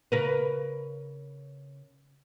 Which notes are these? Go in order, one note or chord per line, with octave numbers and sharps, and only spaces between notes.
C#3 A#4 B4